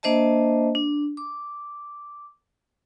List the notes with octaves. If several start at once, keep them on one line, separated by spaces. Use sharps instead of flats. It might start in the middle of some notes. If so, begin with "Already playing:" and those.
A#3 D4 C5 D#5 E5 A5
D4
D6